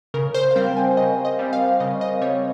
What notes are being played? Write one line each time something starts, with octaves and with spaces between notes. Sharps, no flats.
C#3 A#4
C5
F5
G3 C4 G5
G#5
C#3 D#5
D#5
G3 C4
F5
C#3 D#5
D#5
G3 C4 C#5